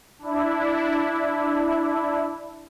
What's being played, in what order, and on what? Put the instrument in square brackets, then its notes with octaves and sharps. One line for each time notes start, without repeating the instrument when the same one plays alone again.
[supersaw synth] D4 E4